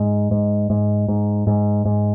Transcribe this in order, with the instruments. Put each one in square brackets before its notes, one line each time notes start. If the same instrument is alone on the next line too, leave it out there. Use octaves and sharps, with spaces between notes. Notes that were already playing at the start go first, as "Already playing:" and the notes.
Already playing: [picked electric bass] G#2
G#2
G#2
G#2
G#2
G#2